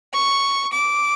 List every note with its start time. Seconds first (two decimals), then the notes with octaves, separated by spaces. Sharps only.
0.14 C#6
0.72 D6